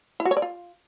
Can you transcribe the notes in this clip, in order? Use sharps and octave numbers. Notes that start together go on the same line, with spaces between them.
E4
F#4
C#5
D5
F4